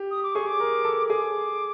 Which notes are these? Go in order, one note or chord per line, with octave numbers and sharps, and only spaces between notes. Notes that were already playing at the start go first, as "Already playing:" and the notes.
Already playing: G4
D#6
D6
G#4 C#6
D6
A#4
A4
G#4 D6